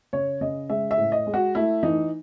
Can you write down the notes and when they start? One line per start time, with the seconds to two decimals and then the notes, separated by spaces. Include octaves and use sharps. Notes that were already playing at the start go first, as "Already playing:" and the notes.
0.13 C#3 C#5
0.41 C#3 D#5
0.69 G#3 E5
0.91 E5
0.97 A2
1.12 D#5
1.27 G#3
1.34 F#4
1.55 A3 E4
1.83 E3 D#4